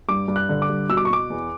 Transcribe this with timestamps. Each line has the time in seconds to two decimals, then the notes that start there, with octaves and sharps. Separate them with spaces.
0.08 G2 D6
0.28 G2
0.36 F#6
0.49 D3
0.62 D6
0.69 G2
0.89 B2 E6
0.97 D6
1.05 C#6
1.10 B2 D6
1.30 E2